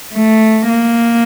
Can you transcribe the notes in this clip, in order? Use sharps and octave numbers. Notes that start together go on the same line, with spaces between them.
A3
A#3